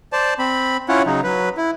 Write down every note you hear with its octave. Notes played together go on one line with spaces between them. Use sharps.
C5 D5 A5
C4 B5
C#4 E4 F4 C#5 F#5
C#3 F#3 D#4
F#3 B4
E4